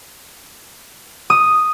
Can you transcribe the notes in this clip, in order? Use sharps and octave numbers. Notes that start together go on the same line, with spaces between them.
D#6